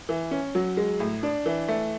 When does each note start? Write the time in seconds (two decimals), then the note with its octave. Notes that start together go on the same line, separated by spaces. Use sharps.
0.09 E3
0.31 C#4
0.55 F#3
0.77 G#3
1.00 A2
1.23 D4
1.46 E3
1.68 A3